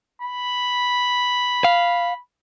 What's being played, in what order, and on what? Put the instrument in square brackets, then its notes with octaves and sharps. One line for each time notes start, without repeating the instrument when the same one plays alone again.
[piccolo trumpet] B5
[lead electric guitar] F5